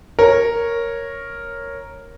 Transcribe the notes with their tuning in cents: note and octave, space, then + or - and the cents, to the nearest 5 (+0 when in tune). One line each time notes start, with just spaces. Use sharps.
A#4 +0 C#5 -5